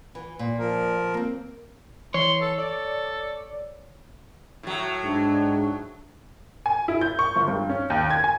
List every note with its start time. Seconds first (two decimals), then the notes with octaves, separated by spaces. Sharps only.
0.15 E3
0.39 A#2
0.59 F3 A#4
1.14 A#3 C4
2.14 E3 C#5 C6
2.41 A4
2.58 A4 D5
4.63 A2 F#3
5.04 G#2 D4
6.66 G#5
6.88 E4
7.01 G6
7.19 C#6
7.36 G1
7.48 G2
7.69 C#4
7.90 D#2
8.10 G#6
8.24 G#5